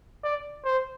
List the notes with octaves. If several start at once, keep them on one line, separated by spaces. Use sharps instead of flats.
D5
C5